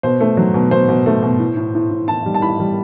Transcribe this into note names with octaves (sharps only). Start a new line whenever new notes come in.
B2 C5
A3
F#3
B2
B2 C5
B2
A3
B2
A2
A2
A2
A2
A2 A5
G3
A5
A2 B5
G3